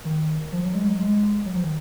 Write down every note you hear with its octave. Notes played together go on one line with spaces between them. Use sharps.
D#3
F3
F#3
G#3
F#3
G#3
F#3
F3
D#3